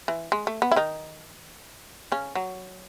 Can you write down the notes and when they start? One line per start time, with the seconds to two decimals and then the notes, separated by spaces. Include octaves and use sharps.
0.08 E3
0.32 G#3
0.47 A3
0.62 B3
0.72 E4
0.76 D#3 D#4
2.12 C#3 C#4
2.35 F#3